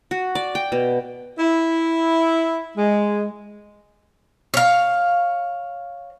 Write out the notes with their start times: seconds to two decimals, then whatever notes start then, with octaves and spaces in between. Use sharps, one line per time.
0.11 F#4
0.35 D5
0.55 G5
0.72 B2
1.38 E4
2.77 G#3
4.54 C#5 F5